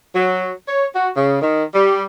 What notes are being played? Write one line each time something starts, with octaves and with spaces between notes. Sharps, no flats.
F#3
C#5
F#4
C#3
D#3
G3